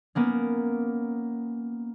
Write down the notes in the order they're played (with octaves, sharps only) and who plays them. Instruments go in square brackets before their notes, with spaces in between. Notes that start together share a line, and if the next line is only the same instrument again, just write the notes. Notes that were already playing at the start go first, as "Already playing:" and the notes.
[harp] A#3 B3 C#4